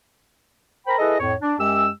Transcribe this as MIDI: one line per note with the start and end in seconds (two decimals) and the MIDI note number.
0.86 0.97 70
0.86 0.97 72
0.86 0.97 79
0.86 0.97 82
0.86 0.97 83
0.98 1.15 64
0.98 1.15 68
0.98 1.15 69
0.98 1.15 71
0.98 1.15 75
1.19 1.33 41
1.19 1.33 45
1.19 1.33 73
1.41 1.54 62
1.59 1.88 42
1.59 1.88 56
1.59 1.88 67
1.59 1.88 88